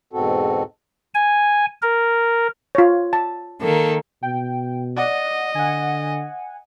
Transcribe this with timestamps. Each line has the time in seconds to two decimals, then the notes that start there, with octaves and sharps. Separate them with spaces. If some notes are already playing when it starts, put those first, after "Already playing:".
0.13 E2 G#2 B2 C4 F#4 A4
1.15 G#5
1.82 A#4
2.75 F4 C#5
3.13 A5
3.62 D#3 A#3 A4
4.23 B2 G5
4.97 D5 D#5 F#5
5.55 D3 F#5 G#5